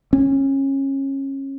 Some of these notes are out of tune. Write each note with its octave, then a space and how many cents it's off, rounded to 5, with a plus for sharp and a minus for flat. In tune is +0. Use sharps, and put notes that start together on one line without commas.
C#4 -25